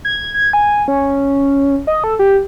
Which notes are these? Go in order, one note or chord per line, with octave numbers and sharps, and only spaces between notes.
G#6
G#6
G#5
C#4
D#5
A4
G4